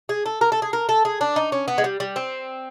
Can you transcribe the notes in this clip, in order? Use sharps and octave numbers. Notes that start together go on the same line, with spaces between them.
G#4
A4
A#4
A4
G#4
A#4
A4
G#4
D4
D#4
C#4
B3
G#3
G3
G3
C4